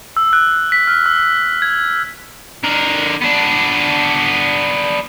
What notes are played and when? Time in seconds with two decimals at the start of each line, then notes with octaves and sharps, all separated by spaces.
0.17 E6
0.33 F#6
0.72 B6
0.87 F6
1.06 E6
1.62 G#6
2.64 D3 A#4
3.22 B3 D4